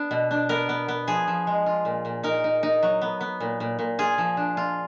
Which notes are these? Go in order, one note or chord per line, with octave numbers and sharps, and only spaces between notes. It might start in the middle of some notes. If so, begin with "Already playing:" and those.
Already playing: B3 D4
B2
D4
B3 A#4
B3
B3
F3 G#4
F3
G#3
F4
A#2
A#2
D#4 A#4
D#4
D#4
F#3
B3
B3
A#2
A#2
A#2
F4 G#4
F3
D4
F4